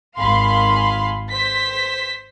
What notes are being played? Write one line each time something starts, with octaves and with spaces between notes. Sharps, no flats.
G#1 G#4 F5 B5 C6
C5 B6